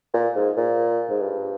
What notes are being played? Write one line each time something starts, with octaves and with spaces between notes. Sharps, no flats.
A#2
G#2
A#2
G#2
G2